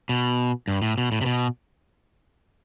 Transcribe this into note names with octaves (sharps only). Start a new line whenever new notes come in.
B2
G2
A2
B2
A2
C3
B2